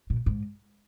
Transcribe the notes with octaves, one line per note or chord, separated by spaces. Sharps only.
A#2
G#2